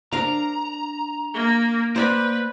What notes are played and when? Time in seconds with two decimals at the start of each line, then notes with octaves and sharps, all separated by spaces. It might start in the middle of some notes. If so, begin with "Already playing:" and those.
0.12 D4 A#4 F5 A#5
1.34 A#3
1.96 A#3 B4 C5 D5 B5